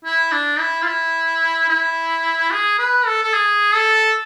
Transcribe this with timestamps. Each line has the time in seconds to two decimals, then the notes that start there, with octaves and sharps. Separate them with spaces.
0.05 E4
0.32 D4
0.59 E4
0.82 F4
0.87 E4
1.69 E4
2.51 G#4
2.79 B4
3.06 A4
3.23 A4
3.33 G#4
3.74 A4